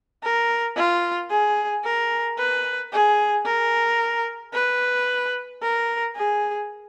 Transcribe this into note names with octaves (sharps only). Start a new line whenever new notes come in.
A#4
F4
G#4
A#4
B4
G#4
A#4
B4
A#4
G#4